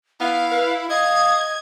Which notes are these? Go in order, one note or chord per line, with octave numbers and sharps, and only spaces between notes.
B3 E4 F5
B4
D#5 F5 D#6 G#6